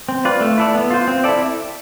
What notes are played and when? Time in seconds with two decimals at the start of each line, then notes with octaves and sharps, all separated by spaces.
0.09 C4
0.25 F4 B4 D5
0.41 A3
0.58 E4 A4 D5
0.75 B3
0.91 F4 C5
1.08 C4
1.24 E4 A4 D5